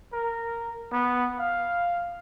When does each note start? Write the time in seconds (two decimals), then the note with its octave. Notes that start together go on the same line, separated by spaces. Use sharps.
0.13 A#4
0.92 B3
1.39 F5